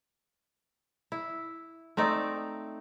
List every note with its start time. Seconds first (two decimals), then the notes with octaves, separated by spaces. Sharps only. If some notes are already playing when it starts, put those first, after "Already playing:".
1.12 E4
1.97 A3 C4 D#4 D5